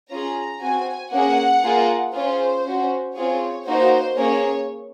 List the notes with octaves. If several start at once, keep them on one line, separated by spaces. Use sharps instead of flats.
C#4 F4 G#4 A#5
C4 F#4 G#5
A#3 C#4 G#4 F#5
A#3 F4 G#4
C#4 F4 G#4 C5
C#4 F#4
C4 F4 G#4 C#5
A#3 D#4 F#4 C5
A#3 C#4 G#4 C#5